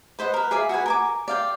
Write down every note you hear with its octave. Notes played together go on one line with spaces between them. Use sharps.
B4 C5 D#5 F#5
A#4 B4
G#4 D5 E5 F5
F#4 G#4 B4 G#5
A#4 G#5 D6
D5 F5 G5